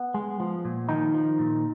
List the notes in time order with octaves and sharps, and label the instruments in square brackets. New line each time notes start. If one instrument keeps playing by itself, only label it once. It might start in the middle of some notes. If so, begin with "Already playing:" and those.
Already playing: [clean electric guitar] B3
G#3
F3
A#2
D#3 F3 D#4
F3
A#2